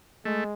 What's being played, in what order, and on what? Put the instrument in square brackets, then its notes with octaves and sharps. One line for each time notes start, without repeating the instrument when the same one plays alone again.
[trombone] G#3 [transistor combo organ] A3